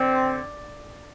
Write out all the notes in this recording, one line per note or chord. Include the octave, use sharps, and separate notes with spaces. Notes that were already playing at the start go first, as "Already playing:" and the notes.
Already playing: D3 C4